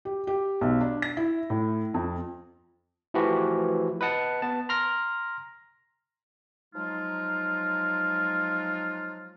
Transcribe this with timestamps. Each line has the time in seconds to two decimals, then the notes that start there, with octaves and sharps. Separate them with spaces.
0.05 G4
0.27 G4
0.61 B1
0.81 D4
1.02 A#6
1.17 E4
1.50 A2
1.94 F2
3.14 E3 F3 A3 F#4 G4 B4
4.01 B4 D#5 F#5 A5
4.42 B3 A5
4.69 A#5 C6 F6 A#6
6.74 F3 F#3 G#3 D#4 F4